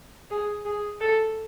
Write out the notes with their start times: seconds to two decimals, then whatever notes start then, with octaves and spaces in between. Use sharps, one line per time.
0.31 G#4
0.65 G#4
1.01 A4